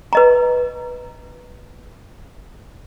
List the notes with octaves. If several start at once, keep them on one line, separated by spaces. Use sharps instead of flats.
B4 D#5 A#5